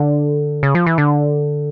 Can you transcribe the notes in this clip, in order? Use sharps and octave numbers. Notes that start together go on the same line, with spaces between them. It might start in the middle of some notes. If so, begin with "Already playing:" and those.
Already playing: D3
C#3
F3
E3
D3